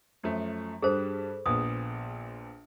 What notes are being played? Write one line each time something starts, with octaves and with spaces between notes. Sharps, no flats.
F#2 F3 A3
G2 G3 G#4 A4 C5
A#1 A#2 B3 D#6